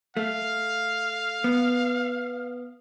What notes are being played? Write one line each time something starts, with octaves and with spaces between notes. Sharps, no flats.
A3 F5
B3